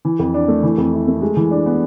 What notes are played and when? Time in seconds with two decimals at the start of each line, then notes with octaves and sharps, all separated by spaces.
0.05 E3
0.19 F2
0.34 D4
0.48 A3
0.63 E3
0.78 F2
0.93 E4
1.08 A3
1.22 G#3
1.36 E3
1.51 D4
1.66 B3